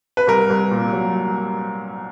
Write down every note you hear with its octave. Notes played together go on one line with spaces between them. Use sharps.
B4
C2 A#4
C2
A#2
F#3